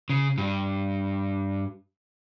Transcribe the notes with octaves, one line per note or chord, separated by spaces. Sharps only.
C#3
G2